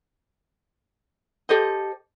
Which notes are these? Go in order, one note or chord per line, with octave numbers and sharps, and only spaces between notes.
G4 A4 C5 D#5